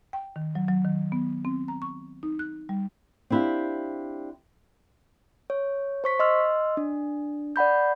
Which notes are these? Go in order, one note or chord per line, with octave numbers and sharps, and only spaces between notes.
G5
D#3
F#3
F#3
D#3
B3
C4
A#5
C#6
D#4
F#6
G3
C4 D4 E4 G4 F5
C#5
C5 C#6 B6
D#5 C6 E6 F6
D4
D5 F#5 B5 G6